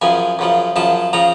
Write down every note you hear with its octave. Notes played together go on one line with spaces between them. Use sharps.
F#2 C#3 F3 G#5
F#2 C#3 F3
F#2 C#3 F3 A5
C#3 F3 A#5